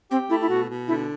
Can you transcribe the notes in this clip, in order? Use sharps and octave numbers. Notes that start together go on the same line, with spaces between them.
C4 G4
A3 E4
E4
B2 F#4
B2
D3 E4